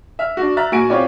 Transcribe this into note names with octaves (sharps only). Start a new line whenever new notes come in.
E5 F6
D4 F#4
E5 A#5 F6 F#6 A6
A#2 F#4 G#5 D7
C4 C#4 F4 G4 C#5 D5